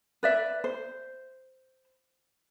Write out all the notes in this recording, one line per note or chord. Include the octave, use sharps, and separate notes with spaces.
B4 D5 E5
C5